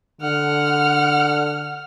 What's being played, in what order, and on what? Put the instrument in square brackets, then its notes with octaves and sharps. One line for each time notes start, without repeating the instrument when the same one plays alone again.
[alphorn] D3 [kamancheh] F#5 F6